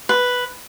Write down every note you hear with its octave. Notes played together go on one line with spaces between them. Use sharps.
B4